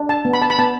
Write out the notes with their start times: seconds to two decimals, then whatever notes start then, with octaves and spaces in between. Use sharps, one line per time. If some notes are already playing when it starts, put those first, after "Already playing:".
Already playing: D4
0.09 A5
0.25 B3
0.33 B5
0.42 A5
0.50 B5
0.59 B3 A5